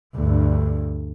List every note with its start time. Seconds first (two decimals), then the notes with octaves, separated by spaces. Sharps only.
0.16 D2 G2